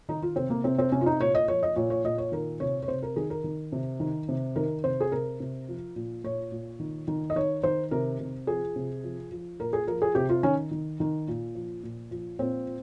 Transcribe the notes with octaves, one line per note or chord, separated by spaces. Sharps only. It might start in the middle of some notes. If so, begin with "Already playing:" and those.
D#3 D#4
F4
C3 C4
A#3
C3 C4
C4
C3 C#4
F4
D#4
A#2 C#5
D#5
F3 C#5
D#5
A#2 C#5
C#5
A#2 D#5
C#5
D#3 A#4
C3 C#5
C#5
C3 C5
A#4
D#3 G#4
A#4
D#3
C3
D#3
C3
D#3 A#4
C3 C5
G#4
C3 A#4
C3
F3
A#2
A#2 C#5
A#2
D#3
D#3
D#5
D#3 C#5
D#3 C5
C3 A#4
C3
F3 G#4
C3
F3
F3
A#2 A#4
G#4
F3 A#4
G#4
C3 G4
F4
D#3 C#4
D#3
D#3
A#2
F3
A#2
F3
A#2 C4